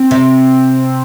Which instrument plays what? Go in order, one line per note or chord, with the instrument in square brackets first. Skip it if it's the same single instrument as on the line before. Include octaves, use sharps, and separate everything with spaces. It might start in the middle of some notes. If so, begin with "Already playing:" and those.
Already playing: [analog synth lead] C4
[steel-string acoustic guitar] C3